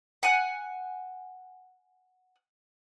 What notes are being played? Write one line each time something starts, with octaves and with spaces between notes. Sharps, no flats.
F#5 G#5 F#6